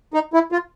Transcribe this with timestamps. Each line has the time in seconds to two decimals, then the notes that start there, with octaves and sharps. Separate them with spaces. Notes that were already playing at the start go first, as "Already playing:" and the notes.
0.14 D#4
0.33 E4
0.52 F4